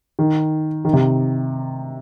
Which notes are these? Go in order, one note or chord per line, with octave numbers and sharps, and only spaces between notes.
D#3
D#3
C3